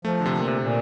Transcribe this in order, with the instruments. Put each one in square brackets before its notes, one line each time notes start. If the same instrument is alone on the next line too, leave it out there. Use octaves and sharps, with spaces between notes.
[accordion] F3 [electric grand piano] A3
[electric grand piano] D3
C3
[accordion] A#2
[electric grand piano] C3
[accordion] A#2